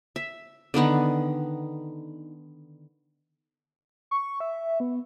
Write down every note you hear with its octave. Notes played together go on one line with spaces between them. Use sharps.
E5
D3 D#3 B3 D#4
C#6
E5
B3